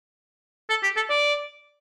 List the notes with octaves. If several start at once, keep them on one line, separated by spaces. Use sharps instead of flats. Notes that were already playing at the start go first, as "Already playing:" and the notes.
A4
G4
A4
D5